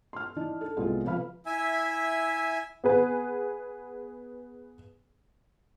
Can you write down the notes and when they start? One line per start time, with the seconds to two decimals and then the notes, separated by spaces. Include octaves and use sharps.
0.13 C6 F6
0.36 E3 D4 D#4
0.61 A4
0.77 C2 A2 G#3 B3 F4
1.05 C3 F3 B4 F5 B5 F6
1.46 E4 E5 G#5
2.84 B3 G#4 B4